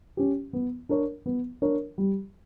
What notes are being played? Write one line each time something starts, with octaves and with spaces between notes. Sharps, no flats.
C#4 G4
B3
D4 A#4 C#5
B3
D4 A#4 C#5
G3